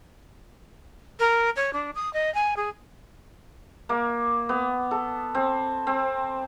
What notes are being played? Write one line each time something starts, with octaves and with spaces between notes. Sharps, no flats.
A#4
C#5
D4
D#6
D#5
G#5
G#4
A#3
B3
A4
C4
C4